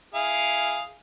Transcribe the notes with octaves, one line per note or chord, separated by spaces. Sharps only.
E4 G#4 F5